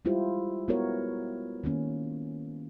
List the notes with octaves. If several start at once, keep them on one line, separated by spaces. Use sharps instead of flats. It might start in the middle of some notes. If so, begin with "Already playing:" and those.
G3 G#3 E4 F4 G4 C5
G#3 B3 E4 F#4 A#4 C#5
D#3 A#3 C#4